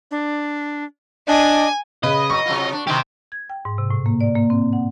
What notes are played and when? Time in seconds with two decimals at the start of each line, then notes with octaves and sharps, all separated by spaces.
0.11 D4
1.28 D4 D#5 G#5
2.03 C#3 B4 D#5
2.30 F#3 C#6
2.46 C3 F#3 F4
2.73 D4
2.87 B2 D#3 D#4 G4 C5
3.32 G#6
3.50 G5
3.65 G#2
3.78 C3
3.90 A2
4.06 A#3
4.21 D5
4.36 A#3
4.50 C4
4.73 F#5